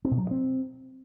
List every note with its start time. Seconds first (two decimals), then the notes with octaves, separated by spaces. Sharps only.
0.05 C4
0.11 B2
0.18 F#3
0.24 G2
0.31 C4